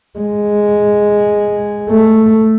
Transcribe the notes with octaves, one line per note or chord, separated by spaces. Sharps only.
G#3
A3